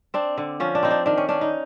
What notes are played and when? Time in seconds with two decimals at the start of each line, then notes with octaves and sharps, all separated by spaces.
0.14 C4 D4
0.37 D3
0.60 F3 C#4
0.75 D4
0.83 C4 D#4
0.90 D4
1.06 D#3 D4
1.18 C#4
1.29 C#4 D4
1.41 D#4